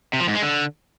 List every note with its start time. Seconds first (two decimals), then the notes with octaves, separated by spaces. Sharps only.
0.13 C3
0.20 F3
0.28 G#2
0.35 G#3
0.42 D3